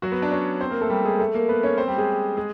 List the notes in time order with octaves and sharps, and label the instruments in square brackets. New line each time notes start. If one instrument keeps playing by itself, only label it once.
[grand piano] F#3 F#4
B3 B4
D4 D5
C#4 C#5
C4 C5
A#3 A#4
A3 A4
G3 G4
G#3 G#4
A3 A4
A#3 A#4
B3 B4
C#4 C#5
C4 C5
G3 G4
G#3 G#4
G#3 G#4